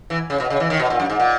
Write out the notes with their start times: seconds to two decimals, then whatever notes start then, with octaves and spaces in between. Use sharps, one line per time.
0.10 E3
0.30 C#3
0.40 B2
0.50 C#3
0.60 E3
0.70 D#3
0.80 B2
0.90 A#2
1.00 F#2
1.10 G#2
1.20 A#2